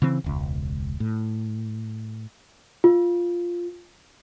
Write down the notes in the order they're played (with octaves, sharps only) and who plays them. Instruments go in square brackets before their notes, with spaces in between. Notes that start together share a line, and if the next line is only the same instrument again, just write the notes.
[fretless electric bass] C#3 E3 C4
E1 C#2
A2
[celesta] F4